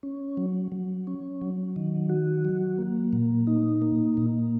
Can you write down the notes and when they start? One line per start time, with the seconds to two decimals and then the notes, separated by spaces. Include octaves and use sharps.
0.03 C#4
0.37 F#3
0.72 F#3
1.07 C#4
1.41 F#3
1.76 D#3
2.09 F#4
2.45 F#3
2.78 A#3
3.13 A#2
3.47 D#4
3.82 A#3
4.17 A#2